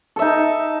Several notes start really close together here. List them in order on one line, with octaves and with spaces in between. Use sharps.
A4 E5 D#4